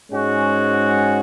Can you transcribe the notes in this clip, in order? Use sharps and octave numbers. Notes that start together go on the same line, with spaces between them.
G#2 G#3 C#4 F#4